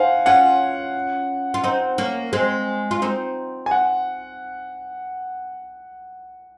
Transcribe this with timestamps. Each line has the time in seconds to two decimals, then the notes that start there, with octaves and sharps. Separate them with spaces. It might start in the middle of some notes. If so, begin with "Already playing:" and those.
Already playing: C4 D#4 F5 F#5 G#5
0.26 C#4 F4 F#5
1.54 F4
1.64 C4 D#4
1.98 A#3 C#4
2.33 G#3 C4
2.91 F4
3.02 C4 D#4
3.66 G#5
3.71 F#5